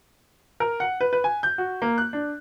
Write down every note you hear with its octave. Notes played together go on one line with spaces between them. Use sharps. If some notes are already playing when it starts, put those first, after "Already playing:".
A#4
F#5
B4
B4
G#5
G6
F#4
A#3
F#6
D4